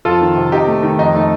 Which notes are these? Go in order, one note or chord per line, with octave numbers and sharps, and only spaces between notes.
F2 F4 A4
D#3
C3
C3 D#4 G4
A3
D#3
F2 D#4
A3 D#4